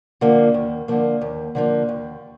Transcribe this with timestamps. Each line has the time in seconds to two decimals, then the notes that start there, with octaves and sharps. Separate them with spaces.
0.21 D3 F3 A#3
0.54 D#2
0.88 D3 F3 A#3
1.21 D#2
1.55 D3 F3 A#3
1.89 D#2